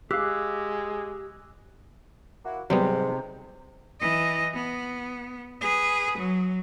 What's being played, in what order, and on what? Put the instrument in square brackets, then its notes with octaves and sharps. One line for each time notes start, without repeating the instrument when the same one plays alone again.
[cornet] G#3 [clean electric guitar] G4 F5 [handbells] D6 E6 F#6
[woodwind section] A#3 E4 F#4
[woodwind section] F2 G#2 [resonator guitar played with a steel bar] C3 [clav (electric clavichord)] F#3 G3 B3
[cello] E3 D#5
B3
G#4 B4
F#3